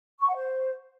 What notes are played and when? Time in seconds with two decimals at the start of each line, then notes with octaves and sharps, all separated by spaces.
0.20 C#6
0.27 F#5
0.34 C5